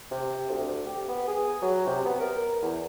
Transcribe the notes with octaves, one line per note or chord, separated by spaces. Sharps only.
C3
D2
G4
B3
G#4
F#3
C3
B3
A#4
E2